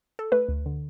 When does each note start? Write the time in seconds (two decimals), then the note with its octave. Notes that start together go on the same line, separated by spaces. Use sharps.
0.19 A4
0.32 A3 B4
0.48 D2
0.66 D3